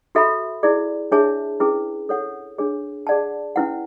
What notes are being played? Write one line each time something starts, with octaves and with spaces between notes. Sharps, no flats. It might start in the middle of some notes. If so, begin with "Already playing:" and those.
F#4 A4 E5 B5
E4 G#4 D5
D4 G#4 C#5 E5 A5
C#4 E4 G#4 B4
A4 C#5 F#5
D4 G#4 C#5
G#4 D5 F#5 A5
C#4 E4 B4 F#5